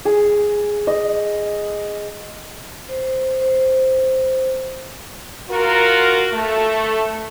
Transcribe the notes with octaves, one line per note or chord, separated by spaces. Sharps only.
G#4
D#5
C5
C5
F4 F#4 A#4
A3